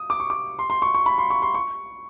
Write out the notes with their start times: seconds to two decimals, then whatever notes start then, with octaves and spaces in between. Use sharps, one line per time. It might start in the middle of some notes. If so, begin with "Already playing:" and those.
Already playing: D#6
0.10 D6
0.20 C#6
0.30 D6
0.59 C6
0.70 C6
0.82 C#6
0.94 C#6
1.06 B5
1.18 C6
1.30 C#6
1.42 C6
1.54 C#6